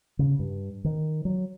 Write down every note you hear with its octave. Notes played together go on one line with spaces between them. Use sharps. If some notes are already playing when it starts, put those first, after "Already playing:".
C#3
G2
D#3
F#3